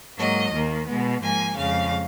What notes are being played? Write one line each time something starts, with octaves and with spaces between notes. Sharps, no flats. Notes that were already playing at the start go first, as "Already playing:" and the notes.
G#2 F#3 A#3 D#5
D#2 D#3 A#3
B2 G#3 B3
G#2 F3 A#3 G#5
F2 C#3 G#3 F5